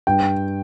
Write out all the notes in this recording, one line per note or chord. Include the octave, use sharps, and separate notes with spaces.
G2 G5